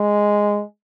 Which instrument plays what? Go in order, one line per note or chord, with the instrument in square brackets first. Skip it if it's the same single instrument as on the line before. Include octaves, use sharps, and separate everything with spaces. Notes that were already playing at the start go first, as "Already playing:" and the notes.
Already playing: [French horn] G#3